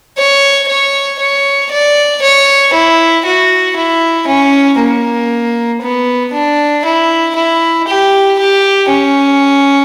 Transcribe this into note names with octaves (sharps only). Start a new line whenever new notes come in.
C#5
C#5
C#5
D5
C#5
E4
F#4
E4
C#4
A#3
B3
D4
E4
E4
G4
G4
C#4